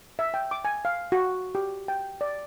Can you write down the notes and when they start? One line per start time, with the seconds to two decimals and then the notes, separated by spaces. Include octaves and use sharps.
0.19 E5
0.34 G5
0.51 D6
0.65 G#5
0.85 F5
1.12 F#4
1.55 G4
1.88 G5
2.21 D5